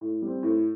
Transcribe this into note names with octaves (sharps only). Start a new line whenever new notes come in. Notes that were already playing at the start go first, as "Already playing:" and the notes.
A2
G3 C4
A2